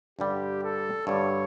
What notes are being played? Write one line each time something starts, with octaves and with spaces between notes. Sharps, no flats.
G2 D3 G3 G4
A4
G2 D3 G3 C#5